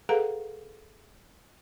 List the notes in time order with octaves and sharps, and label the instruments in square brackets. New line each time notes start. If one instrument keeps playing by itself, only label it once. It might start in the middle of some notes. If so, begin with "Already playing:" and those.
[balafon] G#4 A4 B4 F5 F#5 A#5